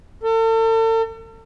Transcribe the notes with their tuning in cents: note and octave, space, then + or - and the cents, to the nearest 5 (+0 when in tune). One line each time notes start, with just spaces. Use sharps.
A4 +40